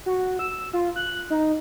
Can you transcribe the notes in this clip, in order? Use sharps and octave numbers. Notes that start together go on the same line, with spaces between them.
F#4
E6
F4
F#6
D#4